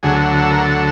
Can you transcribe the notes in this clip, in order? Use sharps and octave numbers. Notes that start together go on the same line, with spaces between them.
D2 D3 F#3 G#4
A4
A#4
A4